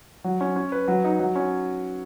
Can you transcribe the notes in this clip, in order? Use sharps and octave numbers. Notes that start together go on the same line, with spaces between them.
F#3
C#4
C#4
B4
F#3
D#4
F#3
C#4